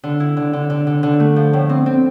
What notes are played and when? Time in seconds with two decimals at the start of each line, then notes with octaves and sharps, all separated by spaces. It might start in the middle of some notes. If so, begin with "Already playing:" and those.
0.04 D3
0.20 E4
0.37 D3
0.53 D3
0.70 D3
0.87 D3
1.03 D3
1.20 A3
1.36 F3
1.53 A2
1.69 C4
1.86 C4